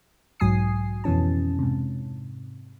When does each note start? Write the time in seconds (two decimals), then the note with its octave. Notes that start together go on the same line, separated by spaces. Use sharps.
0.40 B1 G#2 F#3 G#5 D#6 C7
1.04 F2 B2 E3 C#4 A5
1.59 G#2 C3